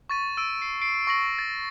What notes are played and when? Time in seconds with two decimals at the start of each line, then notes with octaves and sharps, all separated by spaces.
0.09 C#6 A6 D#7
0.37 E6 D7 D#7
0.62 C7
0.82 C7 D7
1.07 C#6 A#6 F#7
1.39 A6